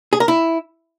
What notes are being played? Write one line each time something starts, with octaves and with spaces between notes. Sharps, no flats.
G#4
A#4
E4